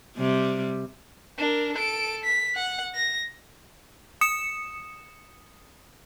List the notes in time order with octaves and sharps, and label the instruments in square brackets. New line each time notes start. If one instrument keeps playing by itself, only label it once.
[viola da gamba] C3 G3
[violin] D4 A#4
A4 D7
B6
F#5
A#6
[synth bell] D#6 C#7 E7